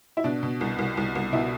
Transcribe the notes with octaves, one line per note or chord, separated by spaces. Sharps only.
E4
B2 D4
B2
C2
C2
C2
C2
B2 E4